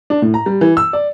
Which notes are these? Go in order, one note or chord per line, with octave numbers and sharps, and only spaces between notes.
D4
A2
A#5
G3
E3
E6
D5